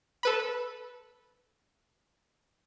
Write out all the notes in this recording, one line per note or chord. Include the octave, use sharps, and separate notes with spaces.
A4 B4 B5